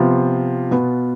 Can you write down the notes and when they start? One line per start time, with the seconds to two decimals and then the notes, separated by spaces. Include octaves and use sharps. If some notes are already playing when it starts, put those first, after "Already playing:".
Already playing: C3 F3 B3 F4
0.71 B2 B3